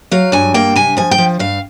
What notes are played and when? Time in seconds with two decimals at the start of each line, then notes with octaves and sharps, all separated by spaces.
0.11 F#3 F5
0.32 G2 G#5
0.54 A#3 G5
0.76 C3 G#5
0.97 F3 G#5
1.11 G5
1.18 F3
1.39 G2 F5